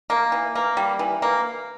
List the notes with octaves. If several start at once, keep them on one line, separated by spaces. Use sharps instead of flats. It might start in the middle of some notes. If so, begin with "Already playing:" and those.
A#3
E3
A#3
G3
E3
A#3